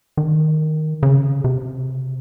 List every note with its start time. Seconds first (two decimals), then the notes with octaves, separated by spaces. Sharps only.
0.17 D#3
1.03 C#3
1.44 C3